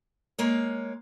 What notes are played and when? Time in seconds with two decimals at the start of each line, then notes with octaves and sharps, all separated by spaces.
0.38 G#3 A#3 C#5